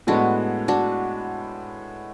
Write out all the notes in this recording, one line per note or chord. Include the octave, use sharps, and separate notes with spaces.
A2 G#3 B3 D4 F#4
D4 F#4